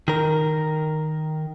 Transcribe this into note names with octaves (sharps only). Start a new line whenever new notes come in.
D#3 A#4